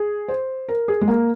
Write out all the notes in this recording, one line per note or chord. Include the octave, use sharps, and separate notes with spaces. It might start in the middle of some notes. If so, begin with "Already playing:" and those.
Already playing: G#4
C5
A#4
G#4
G#3
A#3